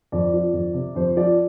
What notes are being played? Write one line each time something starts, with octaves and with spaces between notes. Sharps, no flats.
F2 D5
F3
F2
C3
F2 C5
F3 D5